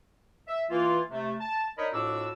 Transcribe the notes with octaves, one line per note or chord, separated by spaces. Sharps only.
E5
E3 A#3 F4
C3 A3
A5
D4 D#4 A#4 C#5 D#5 B5
F2 A2 D4 F#4 D6 E6